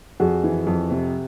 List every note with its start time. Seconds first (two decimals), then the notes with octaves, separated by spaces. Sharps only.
0.20 F2 F#4 G#4
0.44 E3
0.67 F2
0.91 C3